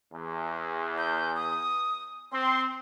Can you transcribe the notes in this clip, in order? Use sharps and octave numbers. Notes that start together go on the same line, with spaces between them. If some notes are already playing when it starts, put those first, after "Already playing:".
E2
G6
D#6
C4 C6